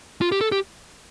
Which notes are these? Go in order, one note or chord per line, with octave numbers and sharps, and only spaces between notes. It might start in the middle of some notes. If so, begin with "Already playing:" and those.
F4
G4
A4
G4